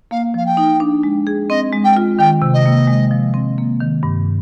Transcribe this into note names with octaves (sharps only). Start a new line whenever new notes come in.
A#3 F5
F3 F5
G5
D#4
D4
G#3
G#4
C4 D#5
G#3
G5
F4
D#3 G5
C3
D#5
A#3
G#3
F3
C4
A#3
D#3
G2